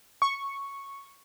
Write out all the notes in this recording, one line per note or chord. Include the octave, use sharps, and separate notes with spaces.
C#6